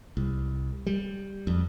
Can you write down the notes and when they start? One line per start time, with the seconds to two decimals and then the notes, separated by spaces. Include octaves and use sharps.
0.17 C2
0.87 G3
1.47 F2